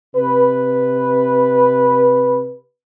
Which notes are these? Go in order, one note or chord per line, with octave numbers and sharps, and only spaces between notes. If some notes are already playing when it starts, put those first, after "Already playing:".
C3 B4